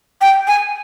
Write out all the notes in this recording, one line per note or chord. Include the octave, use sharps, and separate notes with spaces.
G5
G#5